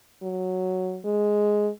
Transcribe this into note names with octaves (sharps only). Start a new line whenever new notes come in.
F#3
G#3